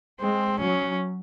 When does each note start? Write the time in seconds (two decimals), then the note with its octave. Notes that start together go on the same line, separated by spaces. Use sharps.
0.21 G#3 C4
0.60 F#3 C#4